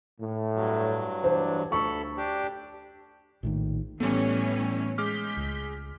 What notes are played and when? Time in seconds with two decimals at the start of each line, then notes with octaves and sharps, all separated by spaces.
0.20 A2
0.55 G2 F#3
1.24 E3 D4 C5
1.72 D2 A4 B5 C#6
2.18 D4 G4
3.43 A#1 A2 D#3
4.00 A2 E3 G3 A3 B3 C#4
4.98 G#3 D6 F6 G6 B6
5.37 C#2